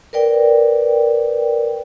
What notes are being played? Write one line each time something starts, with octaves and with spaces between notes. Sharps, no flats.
A#4 B4 D5 G5